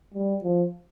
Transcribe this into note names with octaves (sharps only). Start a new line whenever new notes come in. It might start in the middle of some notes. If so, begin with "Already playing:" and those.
G3
F3